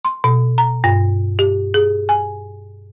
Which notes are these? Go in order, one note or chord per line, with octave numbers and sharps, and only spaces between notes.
C6
B2
A#5
G2
G4
G#4
G#5